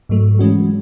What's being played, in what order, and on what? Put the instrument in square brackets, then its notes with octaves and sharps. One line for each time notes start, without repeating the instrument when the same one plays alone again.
[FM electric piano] G#2 F#3 A3
E3 G#3 C#4 F#4